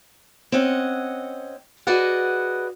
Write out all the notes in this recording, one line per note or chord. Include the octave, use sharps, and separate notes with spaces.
C4 C#4 D#5 F#5
F#4 G#4 B4 D5 D#5 F#5